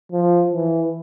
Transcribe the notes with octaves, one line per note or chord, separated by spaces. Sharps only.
F3
E3